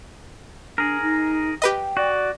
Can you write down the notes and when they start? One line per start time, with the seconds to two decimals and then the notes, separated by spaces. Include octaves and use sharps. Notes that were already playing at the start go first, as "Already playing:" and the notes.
0.78 D4 G#4 A#4
1.02 D#4
1.62 G4 B4 D#5 G5
1.97 F#4 D5